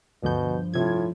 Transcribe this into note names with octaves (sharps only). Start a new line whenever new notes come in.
D2 G2 B2 D3 F3 G6
A2 C3 F4 G#6